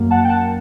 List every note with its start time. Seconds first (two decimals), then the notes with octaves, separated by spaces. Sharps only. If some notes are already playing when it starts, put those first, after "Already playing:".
Already playing: F#2 F#3 A#3
0.11 F#5 A5
0.24 G5
0.28 F#5 A5